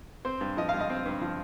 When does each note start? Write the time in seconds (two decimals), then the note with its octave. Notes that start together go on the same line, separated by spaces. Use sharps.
0.25 C4 C5
0.41 G2
0.57 F3 D#5
0.69 F5
0.74 G2
0.80 D#5
0.90 C4
1.06 G2
1.21 F3